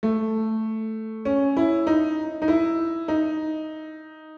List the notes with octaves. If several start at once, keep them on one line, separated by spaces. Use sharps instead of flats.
A3
C#4
E4
D#4
D#4
E4
D#4